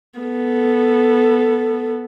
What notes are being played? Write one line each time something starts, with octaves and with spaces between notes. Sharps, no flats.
B3 A4